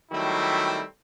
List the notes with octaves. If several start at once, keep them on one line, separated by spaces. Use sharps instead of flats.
D#3 F#3 G3 A3 C4 E4